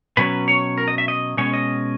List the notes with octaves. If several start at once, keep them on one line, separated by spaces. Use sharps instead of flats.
B2 F#3 C#4 B4
C#5
A#4
D#5
E5
D#5
B2 G#3 C#4 C#5
D#5